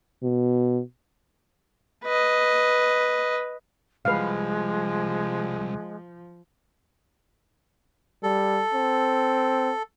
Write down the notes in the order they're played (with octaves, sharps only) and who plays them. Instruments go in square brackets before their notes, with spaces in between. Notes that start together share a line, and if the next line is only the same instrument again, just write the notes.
[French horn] B2
[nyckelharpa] B4 D#5
[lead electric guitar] C2 G3 [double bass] F3 [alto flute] G#3 [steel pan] B4 F5
[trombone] G3 [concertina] A4
[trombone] C4